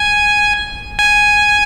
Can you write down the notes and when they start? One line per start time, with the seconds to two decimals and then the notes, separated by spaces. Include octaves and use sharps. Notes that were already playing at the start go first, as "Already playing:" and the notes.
Already playing: G#5
0.99 G#5